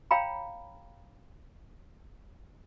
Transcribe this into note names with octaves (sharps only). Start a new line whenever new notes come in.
C#5 F5 G5 A#5 B5